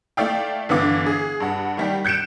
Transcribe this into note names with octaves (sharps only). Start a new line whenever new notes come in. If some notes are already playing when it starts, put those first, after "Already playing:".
A3 E4 D5 F5 G5
G1 D3 E3 B3 F5 D6
G#4
G2 F#5
D#3 G3 G4
F#6 G6 C#7 D7 E7